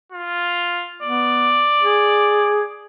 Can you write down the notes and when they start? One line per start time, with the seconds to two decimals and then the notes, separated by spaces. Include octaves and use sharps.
0.12 F4
1.02 B3 D5
1.82 G#4